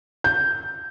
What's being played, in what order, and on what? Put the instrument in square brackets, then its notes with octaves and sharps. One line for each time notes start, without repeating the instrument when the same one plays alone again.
[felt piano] G6